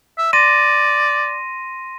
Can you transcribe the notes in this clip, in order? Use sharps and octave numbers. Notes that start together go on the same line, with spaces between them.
E5
D5 C6 A#6 D#7